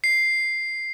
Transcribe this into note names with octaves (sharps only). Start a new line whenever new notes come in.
C7